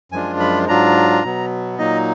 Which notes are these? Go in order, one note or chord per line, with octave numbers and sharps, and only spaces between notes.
F#2 F3 G#3 D4 F4 G#5
B5
G#2 F#3 D4 F4 A#5
B2 F#3 B3
A#2 F#3 A#3 D#4 D#5